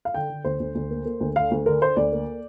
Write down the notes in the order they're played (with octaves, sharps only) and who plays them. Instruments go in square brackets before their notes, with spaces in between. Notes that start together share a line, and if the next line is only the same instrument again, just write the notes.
[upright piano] F5
D3 G5
D3
D2 C5
D2
D2
A#3
A#3
D2
D3 F5
D2
D3 A#4
D3 C5
D2 D5
A#3